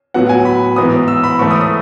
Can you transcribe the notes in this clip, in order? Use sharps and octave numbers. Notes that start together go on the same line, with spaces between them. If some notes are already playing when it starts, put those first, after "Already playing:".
A2 F#3 B3 F#5
F#5
G#5
B5
G#2 E3 B3 D#6
E6
B5
G#2 E3 A3 C#6
D#6
D#6